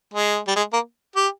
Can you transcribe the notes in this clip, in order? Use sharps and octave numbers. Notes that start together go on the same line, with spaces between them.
G#3
G3
G#3
A#3
G4